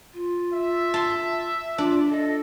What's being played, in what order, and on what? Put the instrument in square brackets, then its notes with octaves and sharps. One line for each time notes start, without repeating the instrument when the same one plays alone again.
[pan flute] F4
[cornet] E5
[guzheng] A5 C6
[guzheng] D4 [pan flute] F4
[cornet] A4 [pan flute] D#5